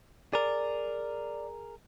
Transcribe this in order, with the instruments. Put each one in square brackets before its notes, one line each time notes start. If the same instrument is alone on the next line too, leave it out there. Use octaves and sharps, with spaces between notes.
[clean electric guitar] G#4 A#4 [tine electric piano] D5